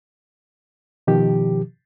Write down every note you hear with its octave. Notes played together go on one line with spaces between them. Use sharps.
B2 D#3 F3 G4